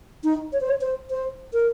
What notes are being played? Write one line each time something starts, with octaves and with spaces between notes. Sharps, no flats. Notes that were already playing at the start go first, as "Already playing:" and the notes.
D#4
C#5
C5
C#5
C5
C5
A#4